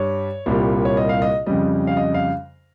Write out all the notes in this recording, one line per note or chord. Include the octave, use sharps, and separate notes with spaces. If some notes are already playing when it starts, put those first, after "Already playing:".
Already playing: G2 G3 C#5
C2 A#2 G3
C#5
D#5
F5
D#5
F2 C#3 G3 D#5
F5
D#5
F5